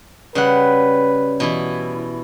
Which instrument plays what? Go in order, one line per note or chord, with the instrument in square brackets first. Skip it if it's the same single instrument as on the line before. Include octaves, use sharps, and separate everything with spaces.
[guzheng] C#3 G3 F#5 [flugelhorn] B4
[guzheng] B2 E3 E4